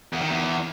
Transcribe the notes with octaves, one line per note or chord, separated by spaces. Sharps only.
E2
D#3
E2